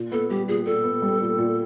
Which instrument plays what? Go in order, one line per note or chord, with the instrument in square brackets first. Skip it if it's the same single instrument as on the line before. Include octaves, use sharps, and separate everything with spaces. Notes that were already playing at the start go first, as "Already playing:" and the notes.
Already playing: [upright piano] A#2
[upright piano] B3 [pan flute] A4
[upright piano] G3 [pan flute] G4
[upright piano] A#2 [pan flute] G#4
[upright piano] A#2 [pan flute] A4
[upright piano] B3
G3
A#2
A#2